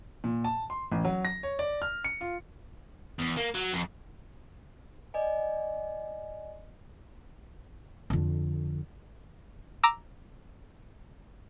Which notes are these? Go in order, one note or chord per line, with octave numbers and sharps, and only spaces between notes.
A#2
A5
C6
A1
F#3
A#6
C#5
D5
F6
C#7
F4
E2
A#3
F#3
F2
D5 D#5 G#5
F2 D3
A#5 D6 E6